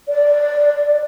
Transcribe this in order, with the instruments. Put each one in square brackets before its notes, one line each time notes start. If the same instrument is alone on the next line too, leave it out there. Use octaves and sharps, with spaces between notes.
[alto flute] D5